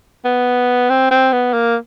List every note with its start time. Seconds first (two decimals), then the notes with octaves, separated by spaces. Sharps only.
0.25 B3
0.90 C4
1.11 C4
1.32 B3
1.53 A#3